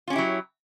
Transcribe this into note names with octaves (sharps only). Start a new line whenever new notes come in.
F#3 C#4 E4 F4 G4